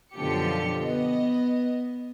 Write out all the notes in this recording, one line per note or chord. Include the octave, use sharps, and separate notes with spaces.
F#2 B2 D3 F3 G4 C#7
B3 D#5